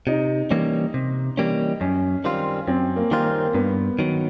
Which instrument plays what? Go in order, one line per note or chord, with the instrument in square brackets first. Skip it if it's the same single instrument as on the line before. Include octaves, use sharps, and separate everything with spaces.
[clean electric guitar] C3 [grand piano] D#4
[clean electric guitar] E3 G3 A#3 C#4
C3
E3 G3 A#3 C#4
[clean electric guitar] F#2 [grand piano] C#4
[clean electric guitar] D#3 G3 C4 F4
[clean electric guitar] F#2 [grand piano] C4
[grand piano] A#3
[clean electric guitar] D#3 G3 C4 F4
[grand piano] A#3
[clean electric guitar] G2 [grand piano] B3
[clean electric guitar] D#3 F#3